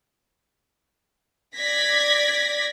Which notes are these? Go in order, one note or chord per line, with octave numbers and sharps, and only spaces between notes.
D5 G#6 A#6 B6